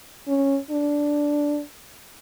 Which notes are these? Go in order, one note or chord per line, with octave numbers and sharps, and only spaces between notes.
C#4
D4